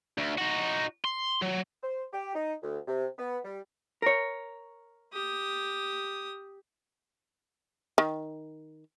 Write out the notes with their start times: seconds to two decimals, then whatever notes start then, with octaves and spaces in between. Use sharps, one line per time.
0.18 D2
0.38 D#4 F#4
1.04 C6
1.42 F#3
1.83 C5
2.13 G4
2.35 D#4
2.63 D2
2.88 C3
3.18 B3
3.45 G3
4.02 A#4 C#5
5.13 G4 D#6
7.98 D#3